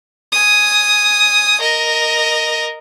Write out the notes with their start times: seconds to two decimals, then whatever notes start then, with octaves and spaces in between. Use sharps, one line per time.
0.32 G#5 D#6
1.60 A#4 D#5